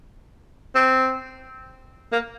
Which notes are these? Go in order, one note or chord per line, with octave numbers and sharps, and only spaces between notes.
C4
A#3